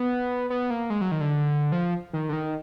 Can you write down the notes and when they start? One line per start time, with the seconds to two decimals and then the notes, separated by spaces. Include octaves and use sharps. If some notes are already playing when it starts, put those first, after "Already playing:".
Already playing: B3
0.50 B3
0.70 A#3
0.90 G#3
1.01 F#3
1.12 D#3
1.21 D3
1.72 F3
2.13 D#3
2.29 D3
2.33 D#3